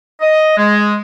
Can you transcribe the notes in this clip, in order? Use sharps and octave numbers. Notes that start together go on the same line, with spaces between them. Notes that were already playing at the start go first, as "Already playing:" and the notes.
D#5
G#3